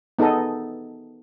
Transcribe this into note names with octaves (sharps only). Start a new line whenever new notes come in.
B3 D#4 G#4 A4 D#5